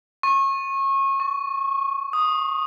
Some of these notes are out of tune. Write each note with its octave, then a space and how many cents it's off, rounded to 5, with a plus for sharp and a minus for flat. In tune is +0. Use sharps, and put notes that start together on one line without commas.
C#6 -30
C#6 +20
D#6 -5